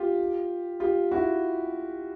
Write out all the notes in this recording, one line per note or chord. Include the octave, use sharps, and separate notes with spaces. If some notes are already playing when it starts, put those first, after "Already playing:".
Already playing: F4 G4
F4 G4
E4 F#4